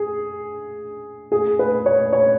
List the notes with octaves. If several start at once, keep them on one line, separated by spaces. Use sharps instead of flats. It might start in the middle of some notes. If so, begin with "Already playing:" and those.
Already playing: G#4
G#4
B4
C#5
C#5